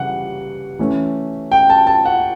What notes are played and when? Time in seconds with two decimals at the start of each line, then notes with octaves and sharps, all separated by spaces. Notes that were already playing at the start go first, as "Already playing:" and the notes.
Already playing: C#3 E3 G3 F#5
0.79 E3 A3 C#4
1.52 G5
1.70 A5
1.87 A5
2.05 F#5